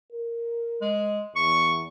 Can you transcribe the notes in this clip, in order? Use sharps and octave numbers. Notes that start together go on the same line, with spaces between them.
A#4
G#3
E2 C#6